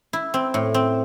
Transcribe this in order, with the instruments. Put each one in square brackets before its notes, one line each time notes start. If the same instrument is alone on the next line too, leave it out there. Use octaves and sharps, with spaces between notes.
[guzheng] E4
C4
A2
C4